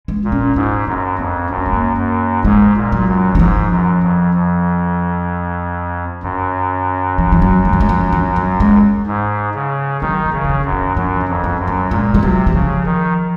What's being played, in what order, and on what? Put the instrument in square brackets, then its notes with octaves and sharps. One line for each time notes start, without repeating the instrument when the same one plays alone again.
[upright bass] G#3
[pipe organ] A#2
[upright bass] C#4
[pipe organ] G#2 [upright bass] D#4
[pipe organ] F#2 [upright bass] C#4
[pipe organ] F2 [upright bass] C4
[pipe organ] F#2 [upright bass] C4
[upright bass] A#3
G#3
A#3
[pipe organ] F#2
[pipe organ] G#2 [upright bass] G#3
[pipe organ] A#2
[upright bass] F#3
[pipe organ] F#2
[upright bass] F#3
[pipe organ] G#2 [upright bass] F3
[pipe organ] F#2
F2
F2
[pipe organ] F#2 [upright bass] D#3
[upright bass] F3
F3
F#3
G#3
F#3
G#3
F3
D#3
F#3
G#3
[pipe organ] G#2
C#3
[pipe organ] D#3 [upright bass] F#3
[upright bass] F3
[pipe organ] C#3
[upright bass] F3
D#3
[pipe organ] F#2
[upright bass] D#3
[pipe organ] F#2 [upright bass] F3
[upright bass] D#3
[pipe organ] F2
[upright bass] F3
[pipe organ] F#2
[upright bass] F#3
[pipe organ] A#2 [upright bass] G#3
[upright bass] G#3
[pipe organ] C3 [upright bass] F#3
[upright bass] F#3
[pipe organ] C#3 [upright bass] F3
[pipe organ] D#3